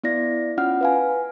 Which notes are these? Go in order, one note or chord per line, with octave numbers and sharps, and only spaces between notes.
B3 E4 D5 A#6
C#4 F4 F#5 F6
B4 F5 G#5